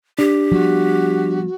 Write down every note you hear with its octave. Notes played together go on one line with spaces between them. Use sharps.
D4 G4
F3 G3 B3 F#4